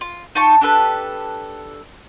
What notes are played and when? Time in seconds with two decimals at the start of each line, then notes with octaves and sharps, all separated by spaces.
0.01 F4
0.35 D#4 F4 A5 C#6
0.61 D4 G4 A4 B4